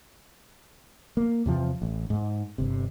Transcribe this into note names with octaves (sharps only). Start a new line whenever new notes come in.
A#3
E2 C3 F3
A1
G#2
G1 C3